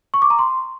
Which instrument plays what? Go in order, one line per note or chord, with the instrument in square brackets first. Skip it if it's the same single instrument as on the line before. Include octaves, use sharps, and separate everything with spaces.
[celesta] C#6
D6
A#5
C6